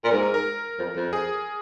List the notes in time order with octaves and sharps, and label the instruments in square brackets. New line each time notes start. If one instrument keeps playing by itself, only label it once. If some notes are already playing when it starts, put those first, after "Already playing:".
[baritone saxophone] A#2
[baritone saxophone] G#2 [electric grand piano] A#4
[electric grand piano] A#4
A#4
[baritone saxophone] F2
F2
[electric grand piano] G#4